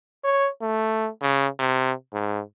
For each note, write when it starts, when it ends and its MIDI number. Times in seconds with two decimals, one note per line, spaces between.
0.24 0.49 73
0.61 1.09 57
1.22 1.47 49
1.59 1.92 48
2.13 2.41 44